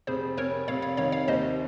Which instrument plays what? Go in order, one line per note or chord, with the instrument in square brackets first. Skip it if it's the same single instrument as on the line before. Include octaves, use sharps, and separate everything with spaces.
[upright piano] F1 [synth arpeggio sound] G#4 C5
[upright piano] F1 [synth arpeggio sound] A#4 C#5
[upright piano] F1 [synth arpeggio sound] C#5 F5
[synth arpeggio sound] C#5 F5
[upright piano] D#3 [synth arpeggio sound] C#5 F5
[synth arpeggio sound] C#5 F5
[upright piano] D#2 [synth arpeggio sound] C5 D#5